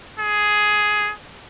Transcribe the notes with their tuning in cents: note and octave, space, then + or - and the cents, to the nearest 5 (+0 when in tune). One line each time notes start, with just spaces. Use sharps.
G#4 +10